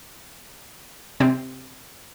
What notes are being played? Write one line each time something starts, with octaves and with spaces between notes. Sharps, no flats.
C3 C4